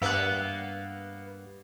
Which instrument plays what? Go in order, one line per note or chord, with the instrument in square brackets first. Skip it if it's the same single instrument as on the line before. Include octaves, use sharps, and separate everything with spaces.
[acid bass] G2 [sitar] A#3 B3 [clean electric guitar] E5 F#5